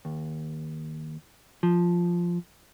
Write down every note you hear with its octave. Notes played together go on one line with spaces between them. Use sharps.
D#2
F3